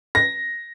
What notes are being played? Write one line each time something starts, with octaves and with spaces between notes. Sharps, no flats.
A#6